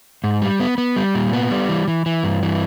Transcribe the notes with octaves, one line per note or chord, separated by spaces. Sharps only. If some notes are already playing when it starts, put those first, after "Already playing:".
G#2
G3
B3
B3
G3
A#2
B3
G3
E3
E3
E3
G2
E3